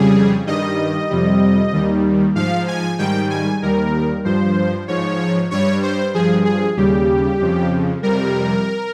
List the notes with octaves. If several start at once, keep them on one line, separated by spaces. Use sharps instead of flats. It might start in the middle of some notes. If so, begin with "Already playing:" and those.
Already playing: F2 C#3 G3 G#4
G2 D#3 G3 D#5
F2 C3 G3
D#2 D#3 G3
G#2 F3 F5
G#5
G#2 D#3 G3 G5
G#5
D#2 D#3 G3 A#4
G2 F3 C5
G#2 F3 C#5
G2 G3 C#5
C5
G2 F3 G#4
G#4
D#2 C#3 G3 G4
F2 C#3 F3
F2 C3 G3 A#4